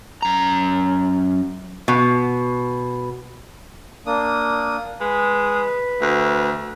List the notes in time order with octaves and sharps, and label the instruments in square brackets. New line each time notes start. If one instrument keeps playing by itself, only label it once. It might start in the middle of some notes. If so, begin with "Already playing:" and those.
[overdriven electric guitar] F#2 A#5
[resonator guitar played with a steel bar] B2
[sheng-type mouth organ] A#3 D4 D#6
[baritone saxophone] G#3 [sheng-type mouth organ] B4
[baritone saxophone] D2